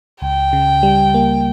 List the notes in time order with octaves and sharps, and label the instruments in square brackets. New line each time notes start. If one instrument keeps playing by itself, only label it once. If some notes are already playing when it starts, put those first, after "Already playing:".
[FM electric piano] C#2 [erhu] G5
[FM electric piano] C#3
G3
A#3